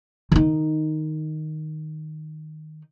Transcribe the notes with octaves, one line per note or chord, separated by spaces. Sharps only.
D#3 D#4